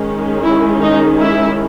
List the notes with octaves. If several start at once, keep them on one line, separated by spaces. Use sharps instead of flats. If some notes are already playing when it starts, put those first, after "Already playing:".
Already playing: D#3 G#3 C#4
E4
D#4
E4